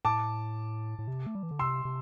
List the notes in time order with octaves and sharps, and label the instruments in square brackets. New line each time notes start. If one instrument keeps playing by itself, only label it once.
[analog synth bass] A2 [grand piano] A5 D6
[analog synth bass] A2
C3
A3
G3
E3
D3
[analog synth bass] C3 [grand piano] C6 E6
[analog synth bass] C3